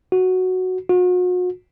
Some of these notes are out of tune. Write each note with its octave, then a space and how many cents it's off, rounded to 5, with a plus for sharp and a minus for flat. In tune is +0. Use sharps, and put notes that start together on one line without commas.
F#4 +0
F#4 -40